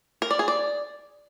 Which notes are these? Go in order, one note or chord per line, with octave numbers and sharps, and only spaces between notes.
A#4
D5
G#4
D5